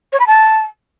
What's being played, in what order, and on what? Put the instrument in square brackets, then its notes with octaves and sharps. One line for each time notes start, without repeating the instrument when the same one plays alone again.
[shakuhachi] C#5
B5
A5